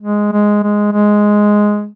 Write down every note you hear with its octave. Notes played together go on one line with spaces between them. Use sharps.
G#3
G#3
G#3
G#3